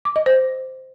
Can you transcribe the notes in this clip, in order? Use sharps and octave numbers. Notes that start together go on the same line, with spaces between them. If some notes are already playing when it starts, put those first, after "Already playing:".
D6
D#5
C5